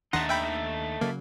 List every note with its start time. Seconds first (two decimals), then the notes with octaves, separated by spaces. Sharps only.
0.13 D#2 D#3 A3 D4 D#4 F#5 C6 A#6
0.29 E5 G5 B5
1.01 C#3 F#3 A#3